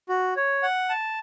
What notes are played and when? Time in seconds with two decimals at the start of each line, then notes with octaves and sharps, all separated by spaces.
0.09 F#4
0.36 C#5
0.63 F#5
0.89 A5